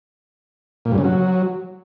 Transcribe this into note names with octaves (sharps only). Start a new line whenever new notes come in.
A#2
G2
C#3
F#3